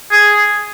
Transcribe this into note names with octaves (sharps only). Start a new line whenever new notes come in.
G#4